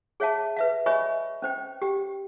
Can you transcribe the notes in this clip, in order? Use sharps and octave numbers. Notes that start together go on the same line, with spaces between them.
G#4 C#5 E5 F5 A5
B4 E5 F5
C#5 D#5 E5 G#5 B5 C#6
C#4 C5 G5
G4 G5